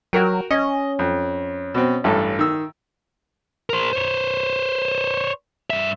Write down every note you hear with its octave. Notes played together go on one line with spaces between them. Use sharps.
F#3 F#4 A#4 G5
C#4 D#5
F2
B2 C4
A1 G2 A4
D#3 E6
A#4 C5
C5 C#5
G2 E5